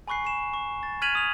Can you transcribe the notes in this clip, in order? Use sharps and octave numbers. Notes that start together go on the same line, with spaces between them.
G#5 B5 C#6 F#6 C7
B5 C#6 C7 E7
C#6
A6
F6 G#6 B6 D#7 F7 F#7
D#6 F7